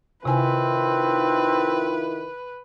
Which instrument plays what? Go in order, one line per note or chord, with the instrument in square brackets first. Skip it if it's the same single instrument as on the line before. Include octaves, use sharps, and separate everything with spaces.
[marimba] C3 G#5 [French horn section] D#3 E4 F4 [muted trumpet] C4 [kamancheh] B4